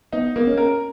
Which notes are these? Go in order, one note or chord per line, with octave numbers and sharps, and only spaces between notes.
B3 D#4
A#3 B3
C#4
A#4